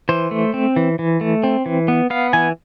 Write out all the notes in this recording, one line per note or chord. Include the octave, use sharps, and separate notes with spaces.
E3 C5
A3
C4
E3
E3
A3
C4
E3
B3
B3 F5
E3 G#5